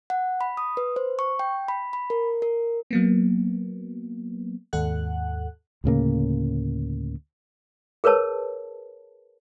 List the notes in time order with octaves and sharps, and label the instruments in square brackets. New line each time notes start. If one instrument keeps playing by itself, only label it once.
[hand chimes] F#5
B5
D#6
B4
C5
C#6
G5
B5
B5
A#4
A#4
[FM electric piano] F#3 A#3 B3
D#2 G#2 A4 F#5 F#6
[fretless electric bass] D2 A2 C#3 A#3
[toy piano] G#4 A#4 B4 C#5 A5